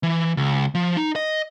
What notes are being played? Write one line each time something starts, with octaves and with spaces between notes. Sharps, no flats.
E3
C#2
F3
D#4
D#5